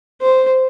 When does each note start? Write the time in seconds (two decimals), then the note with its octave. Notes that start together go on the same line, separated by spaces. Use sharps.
0.21 C5